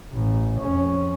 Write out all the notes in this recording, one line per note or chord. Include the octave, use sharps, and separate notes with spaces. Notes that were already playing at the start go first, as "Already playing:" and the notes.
A1
F2 C#4